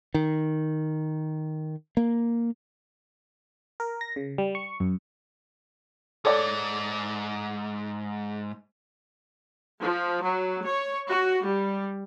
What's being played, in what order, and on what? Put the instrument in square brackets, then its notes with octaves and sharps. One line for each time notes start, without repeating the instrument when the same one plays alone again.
[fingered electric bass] D#3
A#3
[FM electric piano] A#4
A#6
C#3
G3
C#6
F#2
[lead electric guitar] G#2 [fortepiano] A4 C#5 D5
[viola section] F3
F#3
C#5
F#4
G3